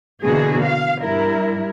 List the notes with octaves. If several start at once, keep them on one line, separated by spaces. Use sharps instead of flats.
B2 D3 E3 A#3 F#4 G#4
F5
G2 G3 E4 A#4